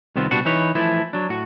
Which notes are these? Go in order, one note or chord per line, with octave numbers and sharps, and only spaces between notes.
C2 D#3 B3 C4 F4
C2 B2 G3 D4 F#4 F#5
E3 D#4 B4 C#5
E3 F3 A3 E4
F#3 D4
A2 F#4